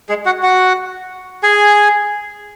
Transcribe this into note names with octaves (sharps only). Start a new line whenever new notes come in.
G#3 G#4
F#4 F#5
F#4 F#5
G#4 G#5